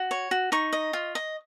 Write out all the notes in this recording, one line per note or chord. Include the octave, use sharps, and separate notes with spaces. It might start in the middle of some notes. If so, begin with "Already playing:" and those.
Already playing: F#4
C#5
F#4
D#4 C#6
D#5
F4
D#5